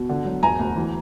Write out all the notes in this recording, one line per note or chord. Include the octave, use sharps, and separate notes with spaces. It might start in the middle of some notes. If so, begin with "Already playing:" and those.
Already playing: B2
D3
F#3
E1 G#5 A#5
D2
E3